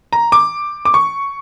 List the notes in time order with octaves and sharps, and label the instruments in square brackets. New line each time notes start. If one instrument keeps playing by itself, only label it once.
[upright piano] A#5
D6
D6
C#6